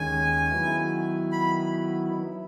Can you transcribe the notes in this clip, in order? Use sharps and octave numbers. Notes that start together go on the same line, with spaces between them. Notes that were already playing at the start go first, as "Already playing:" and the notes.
Already playing: D#2 D#3 G#3 C#4 G#5
D#3 F#3 B3 E4
B5